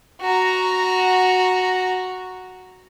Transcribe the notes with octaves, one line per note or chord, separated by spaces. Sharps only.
F#4 A#5